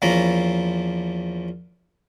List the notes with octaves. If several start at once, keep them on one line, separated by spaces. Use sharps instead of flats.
E2 F3 A#3 C#4 A#5 B5